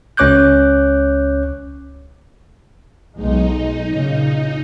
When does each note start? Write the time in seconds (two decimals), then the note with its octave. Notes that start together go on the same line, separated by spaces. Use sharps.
0.17 C#2 C#4 C#5 D6 F#6 G6
3.15 B1 G#3 D#4
3.90 A#2 C#3